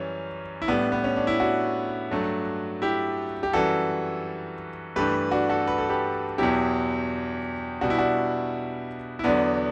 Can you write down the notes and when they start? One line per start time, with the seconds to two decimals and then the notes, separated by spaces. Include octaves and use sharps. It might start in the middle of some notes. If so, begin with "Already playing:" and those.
Already playing: F#2 E3 G3 C#4
0.62 E4
0.68 A2 G3 B3 D4
0.92 B3
1.04 C#4
1.16 D4
1.27 E4
1.40 D4 F#4
2.11 G2 F#3 A3
2.82 E4 G4
3.43 G4
3.53 F#2 E3 G3 F#4 A4
4.96 G2 E3 A3 G4 B4
5.31 D4 F#4
5.49 F#4 A4
5.67 B4
5.78 A4
5.89 G4 B4
6.38 E2 B2 F#3 E4 G4
7.81 B2 G3 F#4
7.90 E4
7.98 D4 F#4
9.19 E4
9.24 E2 D3 F#3 B3 D4